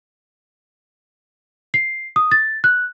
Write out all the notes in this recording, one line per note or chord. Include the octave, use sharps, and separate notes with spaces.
C7
D#6
A6
F#6